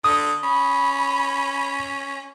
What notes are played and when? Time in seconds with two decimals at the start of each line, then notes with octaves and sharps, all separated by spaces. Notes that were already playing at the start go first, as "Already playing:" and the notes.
0.04 D3 D#6
0.43 C#4 B5